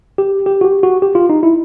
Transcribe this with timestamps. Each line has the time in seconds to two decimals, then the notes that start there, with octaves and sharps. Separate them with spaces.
0.18 G4
0.46 G4
0.61 F#4
0.65 G4
0.83 F#4
1.02 G4
1.15 F4
1.29 D#4
1.43 E4